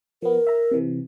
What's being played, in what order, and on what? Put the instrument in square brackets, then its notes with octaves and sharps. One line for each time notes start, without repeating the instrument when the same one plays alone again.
[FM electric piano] F3 B3 [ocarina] A#4
[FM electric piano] E5 A#5
C3 E3